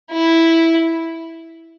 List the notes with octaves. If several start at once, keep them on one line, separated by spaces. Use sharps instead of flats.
E4